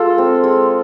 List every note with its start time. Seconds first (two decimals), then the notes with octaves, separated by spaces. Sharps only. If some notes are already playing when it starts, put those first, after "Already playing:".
Already playing: G#3 F4 A4
0.18 C4
0.44 G#3